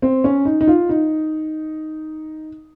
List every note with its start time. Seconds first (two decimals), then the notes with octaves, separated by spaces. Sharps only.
0.02 C4
0.24 C#4
0.45 D#4
0.61 D#4
0.68 F4
0.89 D#4